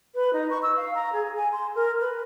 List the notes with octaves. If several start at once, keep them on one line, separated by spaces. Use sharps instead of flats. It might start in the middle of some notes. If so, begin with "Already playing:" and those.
B4
D#4
C#6
E6
F5
A#5
G#4
G#5
C6
A#4
B4